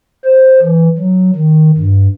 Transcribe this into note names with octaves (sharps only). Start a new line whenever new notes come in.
C5
E3
F#3
D#3
G2